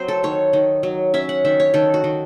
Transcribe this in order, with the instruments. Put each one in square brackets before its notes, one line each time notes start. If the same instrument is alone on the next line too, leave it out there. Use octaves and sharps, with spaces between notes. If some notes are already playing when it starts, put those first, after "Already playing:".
Already playing: [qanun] F#3 C4 C5
A4
D#3 C#5
D#3
F#3
C#4 E5
F#5
D#3 E5
C#5
D#3 A4
F#4
D#3